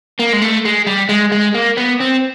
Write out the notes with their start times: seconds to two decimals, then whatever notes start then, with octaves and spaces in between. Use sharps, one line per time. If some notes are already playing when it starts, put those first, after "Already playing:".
0.19 A#3
0.33 G#3
0.42 A3
0.65 G#3
0.87 G3
1.09 G#3
1.32 G#3
1.54 A#3
1.77 B3
2.00 C4